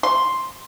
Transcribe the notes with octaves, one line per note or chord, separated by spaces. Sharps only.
C6